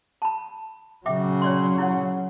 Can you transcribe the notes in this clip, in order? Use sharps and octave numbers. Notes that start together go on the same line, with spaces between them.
A5 B5
C#3 F#3 E5 G5 D6
C#5 D5 C6
E4 C#5 F#5